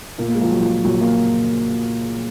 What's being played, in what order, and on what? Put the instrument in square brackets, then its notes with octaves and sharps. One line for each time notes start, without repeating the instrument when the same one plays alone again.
[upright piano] A#2 A#3
A#3
G#3
F3
F#3
F3
A#2 F#3
A#3